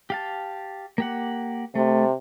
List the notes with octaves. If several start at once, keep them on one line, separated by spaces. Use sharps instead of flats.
G4 F5 A5
A#3 G4 F#5
C3 A3